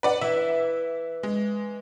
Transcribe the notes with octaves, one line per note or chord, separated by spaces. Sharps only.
B4 D5 F#5
E3 E5
G#3